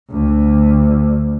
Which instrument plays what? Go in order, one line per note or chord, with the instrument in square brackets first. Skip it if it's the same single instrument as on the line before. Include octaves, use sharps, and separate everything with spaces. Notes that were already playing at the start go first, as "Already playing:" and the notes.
[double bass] D2